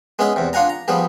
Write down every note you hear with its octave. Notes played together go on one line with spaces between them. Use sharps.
G#3 B3 C#4 E4 G#4
E2 C3
D4 F4 F5 F#5 G#5 A#5
A#5
F3 G3 B3 G#4